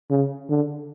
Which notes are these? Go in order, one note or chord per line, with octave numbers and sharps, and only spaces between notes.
C#3
D3